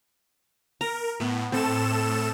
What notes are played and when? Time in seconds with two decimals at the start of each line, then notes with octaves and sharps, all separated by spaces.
0.81 A#4 A#5
1.20 A2 B3
1.52 A2 C4 A4 E7